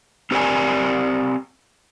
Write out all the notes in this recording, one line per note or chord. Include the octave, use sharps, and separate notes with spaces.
C4 G4 A#4 B4 D5 G#5